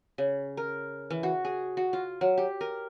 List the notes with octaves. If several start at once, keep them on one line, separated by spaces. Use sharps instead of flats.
C#3
A#4
E3
F#4
G#4
F#4
F4
F#3
G4
A#4